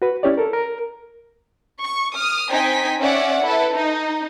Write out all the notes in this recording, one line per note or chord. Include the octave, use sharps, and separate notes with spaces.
F#4 B4
C#4 E4 G4 C#5 D5
A4 A#4
A#4
C#6
D#6 F6
C4 D#4 G5 G#5 B6
C#4 D5 E5 F#5
E4 A4 B4
D#4